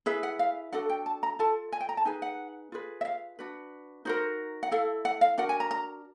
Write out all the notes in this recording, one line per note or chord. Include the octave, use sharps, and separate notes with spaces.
E4 G#4 B4 E5
F#5
F5
D4 F#4 A4 F#5
G5
A5
A#5
F4 A4 A5
G#5
G5
A#5
A5
D#4 G#4 B4 G#5
F#5
F4 G#4 B4
E5
F5
D4 F#4 B4
D#4 F#4 A#4 C5
F#5
E4 A4 F5
F#5
F5
D4 F#4 A#4 F#5
G#5
A#5
A#5